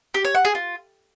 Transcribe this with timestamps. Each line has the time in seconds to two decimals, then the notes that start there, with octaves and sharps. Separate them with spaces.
0.14 G4
0.24 C#5
0.35 F#5
0.45 G#4
0.55 F4